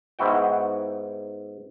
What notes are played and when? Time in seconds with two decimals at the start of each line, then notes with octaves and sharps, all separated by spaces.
0.19 G#2 B3 E4 F#4 G5